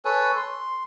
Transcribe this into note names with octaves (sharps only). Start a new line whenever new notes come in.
A4 B4 C#5 G#5
C6